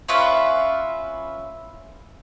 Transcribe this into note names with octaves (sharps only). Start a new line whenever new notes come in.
C#4 F4 B4 E5